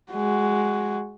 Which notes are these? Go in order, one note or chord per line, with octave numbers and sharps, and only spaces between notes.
G#3 F#4